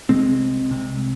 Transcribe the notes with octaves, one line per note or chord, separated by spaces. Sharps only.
C2 C3 G#3 C4
C2 C3